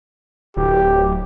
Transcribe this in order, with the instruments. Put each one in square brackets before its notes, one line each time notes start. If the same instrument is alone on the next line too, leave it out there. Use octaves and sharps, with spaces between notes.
[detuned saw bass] D1 [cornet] G4